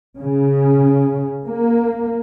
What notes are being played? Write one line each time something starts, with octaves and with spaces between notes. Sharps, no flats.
C#3
A#3